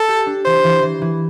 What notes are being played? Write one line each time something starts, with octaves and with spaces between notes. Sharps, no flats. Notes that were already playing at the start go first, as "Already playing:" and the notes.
Already playing: A4
G4
D4
E3 C5
E3
E3
E3